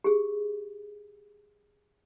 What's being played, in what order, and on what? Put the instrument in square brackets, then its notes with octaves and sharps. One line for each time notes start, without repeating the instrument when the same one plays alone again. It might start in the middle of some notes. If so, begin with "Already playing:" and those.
[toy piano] G4 G#4